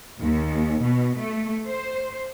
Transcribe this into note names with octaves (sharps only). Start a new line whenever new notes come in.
D#2
B2
A3
C5